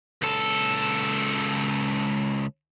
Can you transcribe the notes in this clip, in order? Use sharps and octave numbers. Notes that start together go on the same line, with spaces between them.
C#2 A4